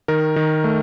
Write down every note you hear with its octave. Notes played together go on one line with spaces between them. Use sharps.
D#3 A#4
D#3
A3